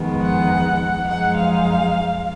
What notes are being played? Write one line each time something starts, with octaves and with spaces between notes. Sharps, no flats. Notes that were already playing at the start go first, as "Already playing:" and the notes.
Already playing: F2 D#3 G#3 B3
F#5
F#2 F3 G#3 D#4 F#5
F5